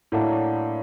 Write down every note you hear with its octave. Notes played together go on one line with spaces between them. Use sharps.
A2 F#3 A#3 D4 F#4